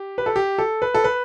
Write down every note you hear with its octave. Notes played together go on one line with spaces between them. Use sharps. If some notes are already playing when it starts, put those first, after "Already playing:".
Already playing: G4
B4
A4
G4
A4
B4
A4
B4